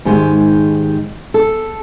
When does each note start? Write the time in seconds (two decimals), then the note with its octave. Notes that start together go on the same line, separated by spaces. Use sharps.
0.05 G#2 D#3 G#3 G4
1.34 A4